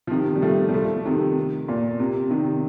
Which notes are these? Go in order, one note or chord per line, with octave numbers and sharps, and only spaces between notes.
F3
C3 D#3
G3
F3 A3
G3
F3 A3
C3 D#3
A#2
C3
C3 D#3